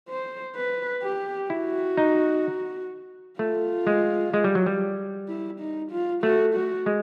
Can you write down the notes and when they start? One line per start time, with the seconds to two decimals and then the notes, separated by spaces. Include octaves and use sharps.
0.09 C5
0.56 B4
1.03 G4
1.50 E4 F#4
1.97 D#4
3.39 A3 F4
3.87 G#3
4.34 G#3
4.44 G3
4.55 F#3
4.66 G3
5.28 E4
5.60 D#4
5.92 F4
6.23 A3 F#4
6.55 F#4
6.86 G#3